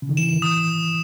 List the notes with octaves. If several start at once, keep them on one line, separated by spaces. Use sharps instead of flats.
C#3
D#3
E3 E7
D#6